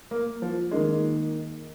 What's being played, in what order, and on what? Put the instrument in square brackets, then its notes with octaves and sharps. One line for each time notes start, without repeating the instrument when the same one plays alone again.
[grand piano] A#3
F3
[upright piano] D#3 A#3 D#4 [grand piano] G#3